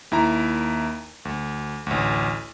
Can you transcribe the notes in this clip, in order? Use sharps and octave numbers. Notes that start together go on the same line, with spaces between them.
D#2 E4 A#5
D2
A1 D2